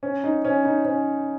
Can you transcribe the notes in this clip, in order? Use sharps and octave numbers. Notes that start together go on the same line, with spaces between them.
C#4
D#4
C#4
D#4
C#4